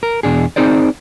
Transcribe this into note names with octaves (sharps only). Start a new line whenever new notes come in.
A#4
E2 B2 D4 G#4
C4 D#4 G#4 C5 D5